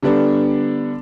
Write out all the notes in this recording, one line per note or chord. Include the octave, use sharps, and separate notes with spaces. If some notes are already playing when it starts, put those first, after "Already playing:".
D3 G3 B3 D4